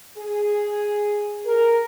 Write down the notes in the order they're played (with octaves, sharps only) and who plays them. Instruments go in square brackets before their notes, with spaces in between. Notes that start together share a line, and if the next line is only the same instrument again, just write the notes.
[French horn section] G#4
A#4